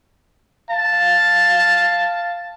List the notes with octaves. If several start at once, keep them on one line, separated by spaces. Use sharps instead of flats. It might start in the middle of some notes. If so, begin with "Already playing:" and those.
F5 A5